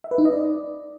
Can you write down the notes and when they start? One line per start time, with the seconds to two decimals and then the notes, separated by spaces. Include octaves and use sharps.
0.04 E5
0.11 B4
0.18 D#4
0.25 D#5
0.32 D5